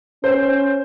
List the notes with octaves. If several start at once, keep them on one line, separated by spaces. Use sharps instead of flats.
C#4 C5